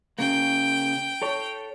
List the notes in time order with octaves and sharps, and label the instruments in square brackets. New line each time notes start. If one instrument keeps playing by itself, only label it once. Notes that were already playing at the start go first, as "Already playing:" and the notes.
[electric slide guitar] C#3 A#3 [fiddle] G5
[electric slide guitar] A4 C#5